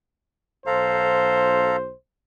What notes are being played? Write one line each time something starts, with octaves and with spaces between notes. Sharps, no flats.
B1 A4 C5 F5 A#5